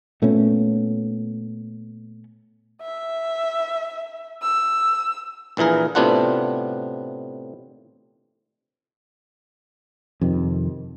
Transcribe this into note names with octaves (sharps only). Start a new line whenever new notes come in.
A#2 A3 B3 C#4
E5
E6
A#1 A#2 E3 G#4 A#4
A2 C3 B3 D4 F4 F#5
F2 C3 D#3